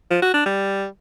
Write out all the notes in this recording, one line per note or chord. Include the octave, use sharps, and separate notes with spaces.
F3
F#4
D4
G3